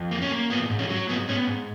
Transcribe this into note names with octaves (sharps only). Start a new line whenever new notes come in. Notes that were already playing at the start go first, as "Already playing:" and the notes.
Already playing: F2
A#3
C#4
A#3
G#2 B3
G#2
C#4
F#3
G#2 B3
B3 C#4
G#2